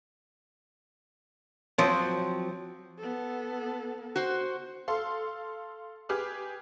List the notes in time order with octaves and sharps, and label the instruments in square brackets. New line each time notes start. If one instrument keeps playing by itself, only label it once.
[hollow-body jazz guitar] F3 F#3 C4
[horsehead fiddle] B3 A4
[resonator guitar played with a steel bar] F#4 C5
[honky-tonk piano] A4 F5 C6
G4 G#4 B4 D6 F6